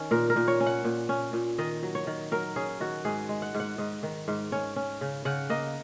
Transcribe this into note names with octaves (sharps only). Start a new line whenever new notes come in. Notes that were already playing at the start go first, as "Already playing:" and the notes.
Already playing: D#3 C#4
A#2 A#4
A#4
A#2
C#5
C#4
F#5
A#2
C#4
A#2
D#3 D#5
F#3
C#5
D#3
F#3 A#4
C#4 G#4
D#3 F#4
G#2 G#4
G#3
F#5
G#2
F#5
G#2 D#5
D#3
G#2
C#4 C#5
C#4
C#3
C#3 F#5
A#3 D#5